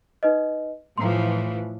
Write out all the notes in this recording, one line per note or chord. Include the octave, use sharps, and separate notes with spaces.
D#4 B4 D#5
A2 E3 F3 A#5 C6